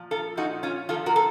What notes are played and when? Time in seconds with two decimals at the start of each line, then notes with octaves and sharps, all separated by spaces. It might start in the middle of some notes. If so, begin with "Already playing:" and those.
Already playing: A#2 F3
0.11 F4 A4
0.37 A#2 F3 D#4 F#4
0.63 C#4 F4
0.89 A#2 F3 F4 A4
1.06 F#4 A#4
1.16 A4